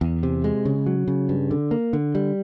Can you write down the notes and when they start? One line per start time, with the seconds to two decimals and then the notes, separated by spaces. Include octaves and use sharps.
0.01 E2
0.23 C3
0.44 G#3
0.65 C#3
0.86 F#3
1.08 C#3
1.29 G2
1.51 D3
1.71 A#3
1.93 D3
2.15 G3